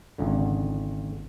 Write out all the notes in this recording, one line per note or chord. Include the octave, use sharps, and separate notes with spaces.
G#1 C#2 D3